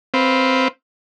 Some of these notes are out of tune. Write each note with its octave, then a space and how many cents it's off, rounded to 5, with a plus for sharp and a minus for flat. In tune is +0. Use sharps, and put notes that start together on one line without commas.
C4 +0 B4 +0 F5 +0